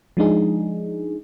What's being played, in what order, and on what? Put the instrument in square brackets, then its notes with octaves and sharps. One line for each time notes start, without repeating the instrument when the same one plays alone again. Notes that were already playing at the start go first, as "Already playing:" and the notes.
[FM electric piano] F3 G#3 D4 D#4 G#4